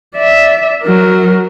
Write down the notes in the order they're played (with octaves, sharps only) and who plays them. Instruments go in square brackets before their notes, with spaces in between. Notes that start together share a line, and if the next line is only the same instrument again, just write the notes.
[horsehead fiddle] D5 E5
F#3 A#4